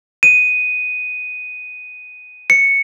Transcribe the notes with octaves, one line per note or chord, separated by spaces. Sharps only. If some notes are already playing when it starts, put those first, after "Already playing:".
D#7
C#7